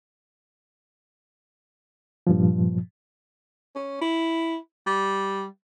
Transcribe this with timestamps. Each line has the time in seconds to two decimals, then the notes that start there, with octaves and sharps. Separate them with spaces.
2.27 G2 A#2 F3
3.75 C#4
4.01 E4
4.87 G3